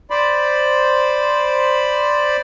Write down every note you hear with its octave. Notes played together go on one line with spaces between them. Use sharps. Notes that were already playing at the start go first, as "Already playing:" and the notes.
C5 D5 B5